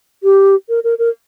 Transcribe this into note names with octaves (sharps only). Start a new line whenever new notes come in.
G4
A#4
A#4
A#4